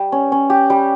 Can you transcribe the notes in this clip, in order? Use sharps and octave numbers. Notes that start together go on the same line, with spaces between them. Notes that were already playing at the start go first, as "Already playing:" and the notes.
Already playing: G3
C#4
C#4
G4
G3